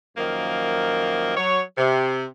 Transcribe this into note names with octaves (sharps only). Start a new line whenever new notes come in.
F#2 D#3 F3 A#3
F#3 C#5
C3